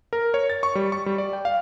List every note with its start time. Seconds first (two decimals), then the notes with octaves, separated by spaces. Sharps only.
0.13 A#4
0.34 C#5
0.50 A6
0.63 C#6
0.75 G3
0.92 C#6
1.06 G3
1.18 D5
1.33 G5
1.45 F5